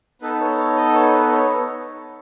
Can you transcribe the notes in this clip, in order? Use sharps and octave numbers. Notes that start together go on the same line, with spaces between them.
B3 D#4 A4 B4
B4
C#5
C#5
D#5
C#5
B4
C#5